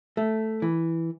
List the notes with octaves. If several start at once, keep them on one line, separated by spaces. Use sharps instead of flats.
A3
E3